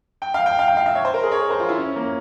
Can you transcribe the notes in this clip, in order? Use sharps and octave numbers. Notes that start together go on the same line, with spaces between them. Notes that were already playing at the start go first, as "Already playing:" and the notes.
G5
F5
G5
F5
G5
F5
E5
C#5
C5
A#4
G#4
C#5
A#4
C5
F4
E4
C#4
A#3